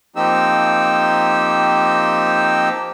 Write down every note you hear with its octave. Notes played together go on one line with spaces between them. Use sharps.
F3 A#3 C4 D#4 G4 E6